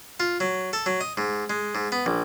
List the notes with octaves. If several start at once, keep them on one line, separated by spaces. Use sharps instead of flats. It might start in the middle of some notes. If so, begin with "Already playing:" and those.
F4
F#3
A4
F#3
D#5
G#2
G#3
G#2
B3
A#1